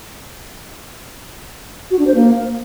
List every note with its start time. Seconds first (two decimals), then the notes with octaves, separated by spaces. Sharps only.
1.91 F#4
1.99 D4
2.07 C5
2.15 A#3